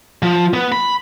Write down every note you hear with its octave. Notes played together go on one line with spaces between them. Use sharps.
F3
B3
B5